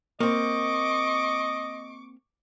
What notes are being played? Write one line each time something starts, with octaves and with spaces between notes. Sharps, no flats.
A#3 C4 D#5 C#6 D6